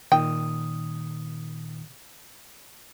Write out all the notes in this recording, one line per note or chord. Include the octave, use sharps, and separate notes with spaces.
A#2 D#3 G5 D#6